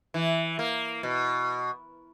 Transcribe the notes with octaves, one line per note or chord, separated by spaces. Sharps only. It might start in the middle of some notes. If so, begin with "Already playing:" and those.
E3
A#3
B2